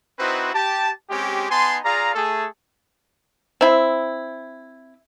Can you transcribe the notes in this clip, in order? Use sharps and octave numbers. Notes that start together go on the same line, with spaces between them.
C4 D#4 E4 F#4 B4 C5
G4 A5
G#3 C4 C#4 G4
B3 D#4 G#5 A5 C6
F4 G#4 D5 F5 A#5
A3 G#4 A4
C4 E4